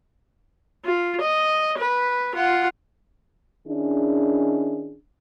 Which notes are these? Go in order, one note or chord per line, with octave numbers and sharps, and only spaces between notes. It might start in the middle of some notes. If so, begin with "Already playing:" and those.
F4
D#5
B4
F4 F#5
D#3 C#4 D4 E4 G#4